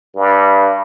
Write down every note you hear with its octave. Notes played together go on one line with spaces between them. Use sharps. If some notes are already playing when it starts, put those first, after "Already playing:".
G2